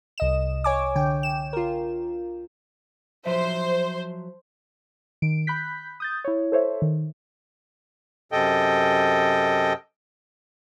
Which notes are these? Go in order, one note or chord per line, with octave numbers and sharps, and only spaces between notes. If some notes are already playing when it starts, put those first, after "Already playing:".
C2 D#5 E7
C#5 G#5 D6
D3 G5
E7
F4 A#4
F3 F#3 C5 E5
D#3 D7
B5 F#6 G6 B6
D#6 G6 A6
E4 C#5
A4 C5 C#5 E5
D#3
F#2 C3 A4 D#5 G5